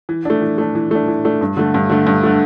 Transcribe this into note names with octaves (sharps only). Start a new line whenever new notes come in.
E3
A3 D4
E3
A3 D4
E3
A3 D4
E3
A3 D4
G2
D3 A3
G2
D3 A3
G2
D3 A3